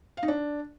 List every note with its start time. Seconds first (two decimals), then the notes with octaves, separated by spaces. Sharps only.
0.17 F5
0.23 D#4
0.28 D4